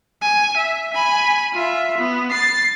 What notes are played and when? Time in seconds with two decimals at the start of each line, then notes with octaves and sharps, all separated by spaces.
0.22 G#5
0.56 E5
0.93 G#5 B5
1.53 F4 E5
1.98 B3
2.30 A6 C7